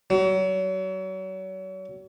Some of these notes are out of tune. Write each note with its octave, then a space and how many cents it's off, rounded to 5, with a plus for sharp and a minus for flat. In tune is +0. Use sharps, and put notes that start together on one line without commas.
F#3 +35